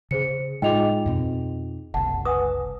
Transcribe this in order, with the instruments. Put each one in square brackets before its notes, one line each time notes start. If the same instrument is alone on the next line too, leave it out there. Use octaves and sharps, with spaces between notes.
[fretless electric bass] C#3 [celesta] G#4 C5 C#7
[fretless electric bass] A2 G#3 [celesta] D#4 F4 F7 [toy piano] G#4 D#5 G5
[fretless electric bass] F2 B2 C4
[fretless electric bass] F#1 C2 [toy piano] F#5 [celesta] A5
[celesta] B4 F#5 G#5 [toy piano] D#6